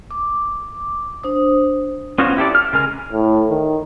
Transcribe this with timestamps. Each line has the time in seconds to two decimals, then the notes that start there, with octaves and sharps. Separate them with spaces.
0.11 D6
1.23 D4 C5 D#6
2.18 B3 C#4 F4 F#4 C5
2.37 E4 G4 A4 D5
2.55 F6
2.73 C#3 G#3 A#4 G#5 F6
3.12 A2
3.50 D#3